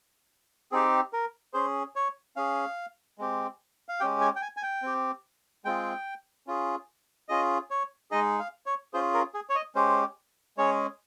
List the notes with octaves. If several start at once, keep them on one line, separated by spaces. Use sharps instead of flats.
C4 D#4 G4 G#4
A#4
C#4 G#4 C5
C#5
C#4 G#4 F5
G#3 C4 G4
F5
G#3 C#4 G4 G5
G#5
G5
G#5
G#5
G5
C4 G4
G#3 C4 F4 G#4 G5
C#4 F4 G#4
C#4 F4 G#4 D#5
C#5
G#3 D#4 G#4 D#5
F5
C#5
C#4 F4 G#4 C5
A#4
G#4
C#5
D#5
G#3 C#4 G4 C5
G#3 C#4 G#4 C#5